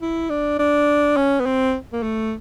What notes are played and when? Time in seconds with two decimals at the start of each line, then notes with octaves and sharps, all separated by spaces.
0.02 E4
0.30 D4
0.59 D4
1.17 C#4
1.40 B3
1.46 C4
1.93 A#3
2.03 A3